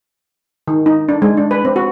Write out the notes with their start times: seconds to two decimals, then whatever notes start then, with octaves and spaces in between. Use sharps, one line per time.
0.68 D#3
0.86 D#4
1.09 D4
1.22 G#3
1.37 D4
1.51 B4
1.65 C4
1.76 F#4